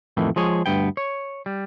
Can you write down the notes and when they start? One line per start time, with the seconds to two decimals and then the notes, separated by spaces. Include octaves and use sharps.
0.17 F2 A2 D#3 E3
0.36 F3 G#3 G#4 C#5
0.66 D2 G2 B3 G5
0.97 C#5
1.46 G3